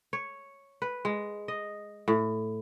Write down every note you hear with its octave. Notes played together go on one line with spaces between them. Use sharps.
C#5
B4
G#3
D#5
A2